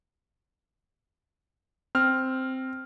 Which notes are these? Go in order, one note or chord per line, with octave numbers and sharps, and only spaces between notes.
C4 F6